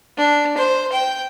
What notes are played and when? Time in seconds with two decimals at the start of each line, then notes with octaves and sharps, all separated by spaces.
0.17 D4
0.57 C5
0.92 G5